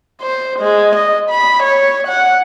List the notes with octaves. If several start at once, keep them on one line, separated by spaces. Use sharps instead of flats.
C5
G#3
D#5
B5
C#5
F#5